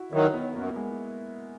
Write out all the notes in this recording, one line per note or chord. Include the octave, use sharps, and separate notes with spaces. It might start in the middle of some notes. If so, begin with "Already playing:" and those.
Already playing: E4 F#4
D#3 F#3 E4
B3
F#2 A#3
G#3